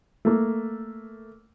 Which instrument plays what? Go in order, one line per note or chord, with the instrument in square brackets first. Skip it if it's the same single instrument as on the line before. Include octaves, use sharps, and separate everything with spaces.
[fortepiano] A3 A#3